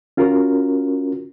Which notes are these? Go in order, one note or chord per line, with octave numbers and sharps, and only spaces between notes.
C#4 F4 F#4 A#4